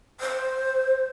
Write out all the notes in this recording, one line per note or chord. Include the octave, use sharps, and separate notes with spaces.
C5